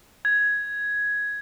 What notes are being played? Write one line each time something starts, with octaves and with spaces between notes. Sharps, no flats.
G#6